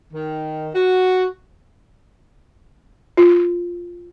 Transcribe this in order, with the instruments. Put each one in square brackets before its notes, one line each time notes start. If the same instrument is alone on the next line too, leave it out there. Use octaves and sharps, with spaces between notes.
[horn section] D#3
F#4
[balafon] F4